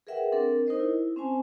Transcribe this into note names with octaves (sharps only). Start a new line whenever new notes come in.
G#4 A#4 B4 E5 F#5 G5
C4 D4 A4 A#4
D#4 A#4 C5 D#5
E4
C4 C#4 C5 G#5 A5